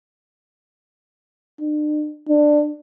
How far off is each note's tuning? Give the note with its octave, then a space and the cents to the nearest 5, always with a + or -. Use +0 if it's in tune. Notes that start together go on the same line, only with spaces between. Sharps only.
D4 +45
D4 +15